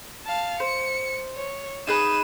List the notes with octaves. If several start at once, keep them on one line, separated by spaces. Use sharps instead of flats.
F5 A5
C5 C#7
C#5
D#4 G#4 B4 D#7 E7